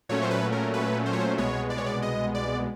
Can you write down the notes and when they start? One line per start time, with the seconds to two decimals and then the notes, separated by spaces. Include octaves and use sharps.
0.09 A#2 F#3 A3 C#4 C#5
0.23 C5
0.31 B4
0.52 A#4
0.74 B4
1.06 C5
1.13 C#5
1.20 C5
1.38 C2 B2 G#3 B3 C#5
1.70 D5
1.78 C#5
1.86 D5
2.02 D#5
2.35 D5